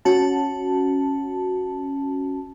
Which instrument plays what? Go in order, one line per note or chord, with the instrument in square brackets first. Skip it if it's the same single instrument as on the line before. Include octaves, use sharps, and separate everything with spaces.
[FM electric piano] C#4 F#4 A5